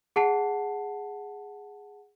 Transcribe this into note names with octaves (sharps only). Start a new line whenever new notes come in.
G#4 F#5 A5 C7